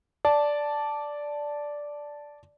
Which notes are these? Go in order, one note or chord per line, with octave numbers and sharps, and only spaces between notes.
D5 A5